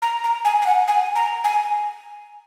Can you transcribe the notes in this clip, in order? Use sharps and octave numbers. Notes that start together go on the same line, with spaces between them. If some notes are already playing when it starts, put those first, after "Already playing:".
A#5
A#5
G#5
G#5
F#5
G#5
A#5
G#5